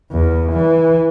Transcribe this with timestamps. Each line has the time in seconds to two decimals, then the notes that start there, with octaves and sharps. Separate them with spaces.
0.11 E2
0.52 E3